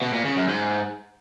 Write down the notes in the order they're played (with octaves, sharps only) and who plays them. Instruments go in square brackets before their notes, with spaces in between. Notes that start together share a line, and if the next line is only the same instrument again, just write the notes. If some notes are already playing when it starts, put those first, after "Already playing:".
[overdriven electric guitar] B2
A#2
C#3
F#2
G#2